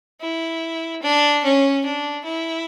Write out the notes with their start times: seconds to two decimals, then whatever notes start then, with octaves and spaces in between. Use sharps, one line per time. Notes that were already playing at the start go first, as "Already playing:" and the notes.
0.21 E4
1.02 D4
1.44 C#4
1.85 D4
2.24 E4